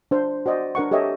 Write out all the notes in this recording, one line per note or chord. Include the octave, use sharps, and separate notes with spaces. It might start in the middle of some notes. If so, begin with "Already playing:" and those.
D4 C5
F#4 C5 D5 D#5
D4 A#4 F#5 C#6
G4 A4 C#5 D#5 E5